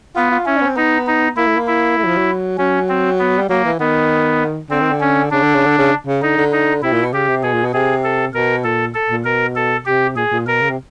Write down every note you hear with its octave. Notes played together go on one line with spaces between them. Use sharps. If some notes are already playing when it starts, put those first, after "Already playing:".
B3 F4
F4
C#4 E4
D4
B3
C4
B3 D#4
D#4
A#3 E4
A3
A#3
E4
A3
F#3
F3
F#3
F#3 C#4
C4
B3
G3
F#3 A#3
E3
D#3 B3
D3 C4
D#3
D3
C#4
C#3 D4
D3
C#3
D3
C#3
C#3
D3 D#4
D3
D#4
C3 E4
A#2
B2
C#3 G4
C3
B2 G#4
A#2
B2
C3 G#4
A4
B2 A#4
A#2 A4
A4
A#2
B2 A#4
A4
C3 G4
A#2 G#4
A#2
B2 A#4
C#3
C3